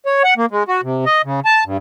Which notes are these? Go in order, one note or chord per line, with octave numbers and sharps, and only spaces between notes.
C#5
F#5
A#3
G#3
F#4
C3
D#5
C#3
A5
G2